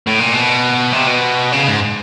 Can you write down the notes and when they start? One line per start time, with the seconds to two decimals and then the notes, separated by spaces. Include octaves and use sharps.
0.07 A2
0.20 A#2
0.33 B2
0.93 C3
1.08 B2
1.52 C#3
1.68 G#2